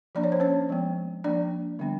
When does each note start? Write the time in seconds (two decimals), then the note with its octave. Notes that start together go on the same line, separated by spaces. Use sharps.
0.15 F3 A#3 D4 D5
0.23 C#5
0.32 C5
0.40 C#4 C#5
0.69 F3 G#3 B3
1.24 F3 A#3 D4 D5
1.79 D3 G3 B3 D4